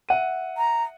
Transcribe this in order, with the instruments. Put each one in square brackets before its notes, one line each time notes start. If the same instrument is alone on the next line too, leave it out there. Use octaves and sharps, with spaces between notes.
[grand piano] E5 F#5 D#7
[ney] A#5